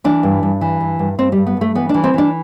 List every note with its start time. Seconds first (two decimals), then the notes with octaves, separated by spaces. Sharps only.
0.04 E3 D4
0.23 G2
0.43 G2
0.61 E3
0.81 G2
0.99 G2
1.18 G2 C4
1.32 G3
1.37 G2
1.46 B3
1.57 G2 A3
1.75 E3 B3
1.89 D4
1.94 E3
2.04 C4
2.14 E3 D4